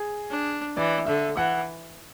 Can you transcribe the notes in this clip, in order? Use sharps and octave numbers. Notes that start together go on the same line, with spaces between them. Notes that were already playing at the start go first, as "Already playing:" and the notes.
Already playing: G#4
D4
E3 D5
D3 E5
E3 F#5